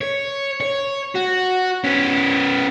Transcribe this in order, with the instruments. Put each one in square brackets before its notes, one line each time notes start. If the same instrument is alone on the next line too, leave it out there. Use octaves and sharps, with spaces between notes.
[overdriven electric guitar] C#5
C#5
F#4
B3 C#4